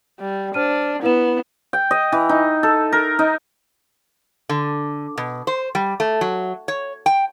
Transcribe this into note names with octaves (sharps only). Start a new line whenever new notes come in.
G3
D4 C5 F6 D#7
B3 E4 B4 E7
G5
D#5
E3
D#4
A4
A#4
D#4
D3
B2
C5
G3
A3
F#3
C#5
G5